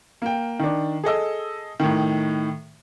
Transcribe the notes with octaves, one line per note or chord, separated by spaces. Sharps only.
A#3 G5
D#3 D4
G#4 A4 D#5 E6
A2 D#3